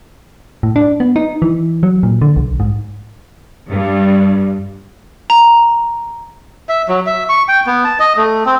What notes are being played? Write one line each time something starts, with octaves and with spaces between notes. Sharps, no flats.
A2
D4
B3
D#4
E3
F#3
A#2
D3
B1
G#2
G2
A#5
E5
F#3
E5
C#6
G5
B3
A5
D#5
A3
C4